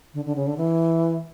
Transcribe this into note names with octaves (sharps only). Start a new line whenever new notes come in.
D3
D3
C#3
D3
E3